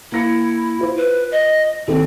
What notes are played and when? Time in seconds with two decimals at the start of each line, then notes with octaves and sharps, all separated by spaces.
0.12 A#3 E4 A#6 C#7
0.79 F4 C5
0.97 B4
1.31 D#5
1.88 D#2 C4 A4